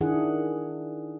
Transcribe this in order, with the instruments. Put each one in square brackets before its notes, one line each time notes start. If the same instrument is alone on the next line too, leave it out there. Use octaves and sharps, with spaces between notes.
[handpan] D#3 D4 E4 G#4 F#5